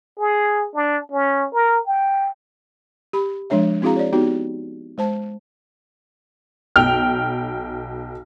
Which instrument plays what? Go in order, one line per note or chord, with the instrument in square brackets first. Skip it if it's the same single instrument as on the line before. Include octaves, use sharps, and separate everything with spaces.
[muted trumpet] G#4
D4
C#4
A#4
G5
[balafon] G4 B5
F3 G#3 D4 C#5 E5
C4 E4 F#4 G#4 F5 A#5
C#5 D5
B3 D#4 F#4 G4
G#3 C5 A5
[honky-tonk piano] B1 G5 F6